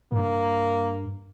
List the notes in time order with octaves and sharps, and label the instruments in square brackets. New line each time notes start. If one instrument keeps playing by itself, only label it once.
[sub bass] G2 [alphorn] A#3